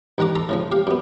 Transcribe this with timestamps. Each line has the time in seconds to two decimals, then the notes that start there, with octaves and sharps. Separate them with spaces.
0.18 A1 D#3 F#5 A#5 D6
0.35 A4 A#5 C6
0.49 A2 C#3 F3
0.72 G4 F5
0.87 F#2 B3